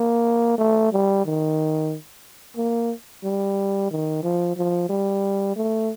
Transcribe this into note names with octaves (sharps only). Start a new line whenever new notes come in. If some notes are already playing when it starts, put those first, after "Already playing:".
Already playing: A#3
A3
G3
D#3
A#3
G3
D#3
F3
F3
G3
A3